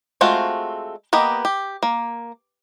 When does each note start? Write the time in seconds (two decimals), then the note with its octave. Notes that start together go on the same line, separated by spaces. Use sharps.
0.21 G#3 A3 C4 F4 F#4
1.13 A#3 B3 G4 D#5
1.45 G4
1.83 A#3